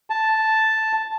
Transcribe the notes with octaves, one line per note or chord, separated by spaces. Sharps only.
A5